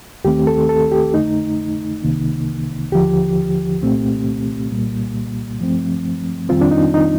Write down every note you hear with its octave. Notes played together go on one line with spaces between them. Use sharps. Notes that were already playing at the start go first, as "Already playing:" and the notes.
D#2 D#3 A3 C4 G4
A4
A4
G4
F2 D3 A3 D#4
C2 C3 D#3 A#3
D#2 D3 F3 G4
C2 A#2 A3 C4
C2 A#2 G3 A#3
G2 F3 A3 C4
F2 D#3 G3 C4 F4
D4
D#4
D#4